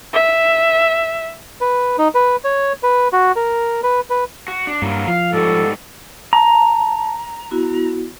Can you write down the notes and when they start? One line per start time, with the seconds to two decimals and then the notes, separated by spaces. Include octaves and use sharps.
0.13 E5
1.61 B4
1.98 D#4
2.15 B4
2.45 C#5
2.83 B4
3.13 F#4
3.36 A#4
3.83 B4
4.10 B4
4.48 F#4
4.67 D4
4.82 G2 F#3 A#3 E4
5.08 F3 F5
5.33 G#2 G3 F#4 A4
6.33 A5 A#5
7.51 B3 E4 F#4